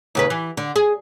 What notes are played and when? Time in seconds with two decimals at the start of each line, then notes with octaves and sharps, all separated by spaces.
0.15 D#2 C#3 B4
0.30 E3
0.57 D3
0.76 G#4